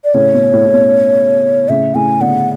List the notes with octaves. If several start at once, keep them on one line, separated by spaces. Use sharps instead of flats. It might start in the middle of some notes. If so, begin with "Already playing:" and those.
D5
A2 C#3 C#5
B2
A2
A2
B2
A2 C#3 E5
A2 C#3 G#5
B2 D3 F#5